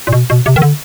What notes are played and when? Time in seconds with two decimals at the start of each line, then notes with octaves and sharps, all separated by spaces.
0.07 A#2
0.12 B2
0.30 B2
0.46 C3
0.56 D#3
0.62 D3